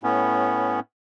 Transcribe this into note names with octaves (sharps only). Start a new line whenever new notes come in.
A2 B3 C#4